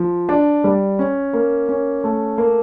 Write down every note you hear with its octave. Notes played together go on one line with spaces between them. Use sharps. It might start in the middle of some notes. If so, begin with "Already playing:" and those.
Already playing: F3
D4
G3
C#4
A#3
C#4
A3
A#3